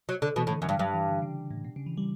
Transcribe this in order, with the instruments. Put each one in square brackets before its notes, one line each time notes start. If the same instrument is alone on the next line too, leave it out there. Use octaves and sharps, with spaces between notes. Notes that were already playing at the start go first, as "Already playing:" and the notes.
[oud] F#3
D3
[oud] B2 [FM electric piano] E3
[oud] A2
[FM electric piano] D3
[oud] F#2
[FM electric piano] E3
[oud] G2
[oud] G2 [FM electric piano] F#3
[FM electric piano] E3
D3
C#3
A2
B2
C#3
E3
G3